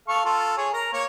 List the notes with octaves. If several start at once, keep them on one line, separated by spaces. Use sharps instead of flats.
A4 F5 C#6
F4 A4
G#4 C#5
A#4 A#5
A#3 C#5 C#6